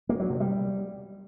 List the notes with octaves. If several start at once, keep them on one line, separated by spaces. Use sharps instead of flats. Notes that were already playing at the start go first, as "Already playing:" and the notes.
A#3
F#3
C3
G3